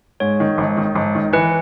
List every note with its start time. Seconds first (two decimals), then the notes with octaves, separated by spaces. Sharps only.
0.20 G#2 C#5
0.40 D#3
0.58 G#1
0.77 D#3
0.95 G#1
1.15 D#3
1.33 E3 B4